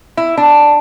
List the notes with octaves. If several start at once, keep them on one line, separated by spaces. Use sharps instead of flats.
E4
D4